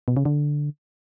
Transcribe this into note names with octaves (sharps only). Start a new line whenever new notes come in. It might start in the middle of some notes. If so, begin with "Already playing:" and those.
B2
C#3
D3